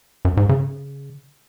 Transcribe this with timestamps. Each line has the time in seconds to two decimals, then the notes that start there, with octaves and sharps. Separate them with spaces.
0.25 F#2
0.37 G#2
0.49 C#3